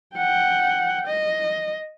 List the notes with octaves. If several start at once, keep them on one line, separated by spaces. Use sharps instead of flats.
F#5 G5
D#5